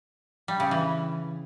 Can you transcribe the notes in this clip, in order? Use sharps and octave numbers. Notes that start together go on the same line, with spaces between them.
G3
C#3
E3